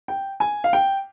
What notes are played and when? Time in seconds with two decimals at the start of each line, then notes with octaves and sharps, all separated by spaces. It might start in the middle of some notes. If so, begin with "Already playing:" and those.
0.08 G5
0.40 G#5
0.64 F5
0.73 G5